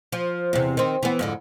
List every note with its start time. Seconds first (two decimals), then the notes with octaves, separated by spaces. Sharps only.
0.12 F3
0.53 E2 C3
0.77 D#3 C4
1.03 E3 B3
1.19 F2 G#2 D3